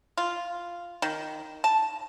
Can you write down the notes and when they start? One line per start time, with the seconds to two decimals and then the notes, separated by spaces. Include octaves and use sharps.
0.17 F4
1.02 D#3
1.64 A5